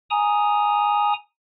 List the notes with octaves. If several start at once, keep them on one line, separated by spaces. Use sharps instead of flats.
G#5 A#5 D#6